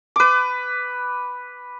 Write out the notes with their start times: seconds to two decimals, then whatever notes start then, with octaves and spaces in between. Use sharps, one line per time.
0.16 B4 D6